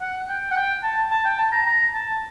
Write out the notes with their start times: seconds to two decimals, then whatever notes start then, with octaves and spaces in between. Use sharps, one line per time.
0.01 F#5
0.29 G5
0.51 F#5
0.56 G5
0.83 A5
1.11 A5
1.25 G5
1.38 A5
1.52 A#5
1.66 A#5
1.94 A5